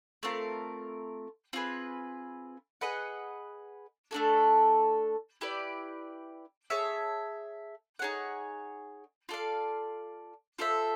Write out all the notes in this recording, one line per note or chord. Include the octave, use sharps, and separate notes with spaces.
A3 C4 F4 A#4
C4 F4 G#4 B4
G#4 B4 D#5 F#5
A3 D4 F#4 A4
E4 G4 B4 D5
G#4 C#5 E5 A5
D#4 G#4 C#5 F#5
F4 A4 D5 F5
F4 A4 C5 E5